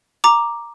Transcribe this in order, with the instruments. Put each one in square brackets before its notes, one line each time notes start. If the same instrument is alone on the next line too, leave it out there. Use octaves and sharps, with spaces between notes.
[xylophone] A#5 D6